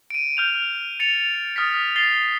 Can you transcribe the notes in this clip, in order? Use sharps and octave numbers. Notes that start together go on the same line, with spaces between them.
D7 D#7
F6 G6 F7
A6 C#7 F7
D#6 F6 A6 B6
A6 C7 F7 G7